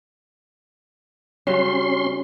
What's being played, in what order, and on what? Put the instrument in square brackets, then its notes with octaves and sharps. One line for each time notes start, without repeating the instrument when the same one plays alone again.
[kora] C#3 F#3 G3 [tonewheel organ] C#4 C6